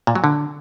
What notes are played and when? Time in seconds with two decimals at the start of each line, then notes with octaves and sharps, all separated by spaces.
0.07 A#2
0.15 F#3
0.24 D3